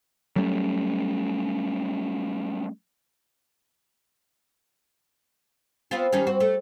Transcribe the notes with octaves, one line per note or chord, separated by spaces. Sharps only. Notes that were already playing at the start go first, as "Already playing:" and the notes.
F#3 G3 A3 C#4
B3 C4 F4
D#3 G3 C#4
C4 F#4
A3